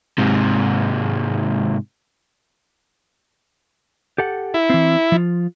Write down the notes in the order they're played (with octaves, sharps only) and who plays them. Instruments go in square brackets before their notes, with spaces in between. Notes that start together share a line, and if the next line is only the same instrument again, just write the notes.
[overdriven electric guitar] G#2 C3
[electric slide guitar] G4 A4 F#5
[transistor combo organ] E4
[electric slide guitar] E3 C4
F3 F4